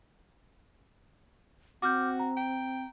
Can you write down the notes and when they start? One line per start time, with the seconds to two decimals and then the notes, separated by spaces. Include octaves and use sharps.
1.82 C4 F#4 D6 F6 G6
2.20 A#5
2.37 G5